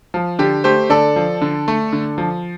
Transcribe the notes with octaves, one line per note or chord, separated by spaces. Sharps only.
F3
D3 G4
A3 G4 C5
D3 A4 D5
F3
D3
A3
D3
F3